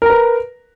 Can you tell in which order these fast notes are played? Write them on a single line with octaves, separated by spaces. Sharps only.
A#4 A#5 B4